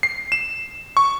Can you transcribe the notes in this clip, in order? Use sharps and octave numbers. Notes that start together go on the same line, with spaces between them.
C7
E7
C#6